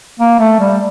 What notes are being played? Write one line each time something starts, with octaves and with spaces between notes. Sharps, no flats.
A#3
A3
G3